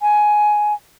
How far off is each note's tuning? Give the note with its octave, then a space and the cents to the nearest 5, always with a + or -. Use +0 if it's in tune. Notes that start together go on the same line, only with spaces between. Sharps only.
G#5 +10